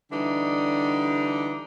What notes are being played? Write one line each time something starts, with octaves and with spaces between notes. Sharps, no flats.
D3 E3 G3 D4 D#4